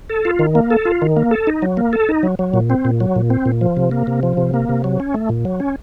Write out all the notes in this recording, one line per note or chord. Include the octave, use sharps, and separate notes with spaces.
A4
F4
D#3
A#3
A4
F4
D#3
A#3
A4
D#4
F#3
A#3
A4
D#4
F#3
F#3
A#2
C4
A#2
F#3
A#2
C4
A#2
F3
C3
A#3
C3
F3
C3
A#3
C3
F#3
C#4
A3
A#2
F#3
C#4